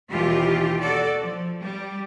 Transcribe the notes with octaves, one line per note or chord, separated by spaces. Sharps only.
D#2 B2 E3 F4 G4
F#4 A4 D5
F3
G3